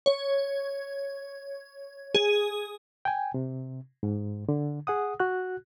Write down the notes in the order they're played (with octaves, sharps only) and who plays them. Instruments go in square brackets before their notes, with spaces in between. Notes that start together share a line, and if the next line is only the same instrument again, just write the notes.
[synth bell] C#5
G#4
[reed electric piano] G5 G#5
C3
G#2
D3
G#4 F#5 D#6
F#4 F#6